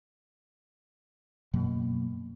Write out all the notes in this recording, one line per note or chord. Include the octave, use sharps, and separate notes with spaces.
F#2 B2 F#3 A#3